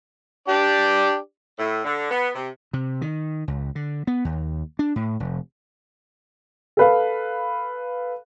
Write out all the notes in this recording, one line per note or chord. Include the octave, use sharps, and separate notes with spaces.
D4 G4 D5
A2
D3
B3
C3
C3
D#3
C#2
D3
B3
D#2
D4
A2
F1
A4 B4 F5